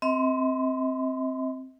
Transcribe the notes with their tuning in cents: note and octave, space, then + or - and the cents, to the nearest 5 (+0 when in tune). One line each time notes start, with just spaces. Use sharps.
C4 +0 D#5 +45 C6 -45